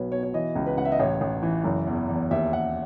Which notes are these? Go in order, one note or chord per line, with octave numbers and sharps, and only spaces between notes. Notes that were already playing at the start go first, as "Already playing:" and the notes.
Already playing: B1 B2 B4 C#5
B2 C#5
C#5
E3 D#5
C#2
B4
C#2 F#5
E5
D#5
A1 C#5
A1
E3
F#1
E2
E2
D#2 E5
D#2 F#5